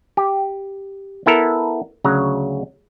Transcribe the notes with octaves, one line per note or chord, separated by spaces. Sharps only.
G4
B3 E4 A4 A#4
D2 C#3 F#3 A#5